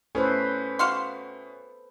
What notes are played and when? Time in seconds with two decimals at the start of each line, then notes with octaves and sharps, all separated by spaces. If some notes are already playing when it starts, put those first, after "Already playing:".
0.15 A2 C#4 A4 B4 C5 G#5
0.79 F#4 F5 F#5 C6